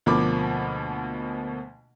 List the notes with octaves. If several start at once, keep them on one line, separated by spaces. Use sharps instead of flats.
D2 B2 F3 A#3 B5 D6